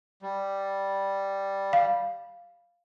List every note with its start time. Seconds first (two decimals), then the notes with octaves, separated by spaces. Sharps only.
0.22 G3
1.73 F5